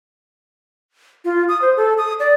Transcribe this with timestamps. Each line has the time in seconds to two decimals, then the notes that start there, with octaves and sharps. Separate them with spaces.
1.25 F4
1.48 D#6
1.62 C5
1.77 A4
1.98 D#6
2.20 D5